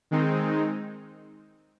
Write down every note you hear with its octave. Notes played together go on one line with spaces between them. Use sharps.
D#3 G#3 C4 D#4